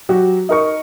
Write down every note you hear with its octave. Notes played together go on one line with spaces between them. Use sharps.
F#3 F#4 G4
D#4 A#4 C#6